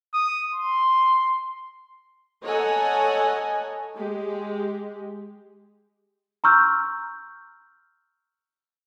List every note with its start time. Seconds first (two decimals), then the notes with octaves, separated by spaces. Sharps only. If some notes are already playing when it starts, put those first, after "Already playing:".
0.14 D#6
0.54 C6
2.44 A4 C#5 D#5 F#5 G#5 A#5
3.96 G#3 G4
6.44 A#5 C6 C#6 E6 F6 G6